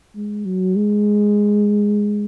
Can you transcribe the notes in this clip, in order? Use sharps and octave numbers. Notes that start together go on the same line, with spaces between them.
G#3
F#3
G#3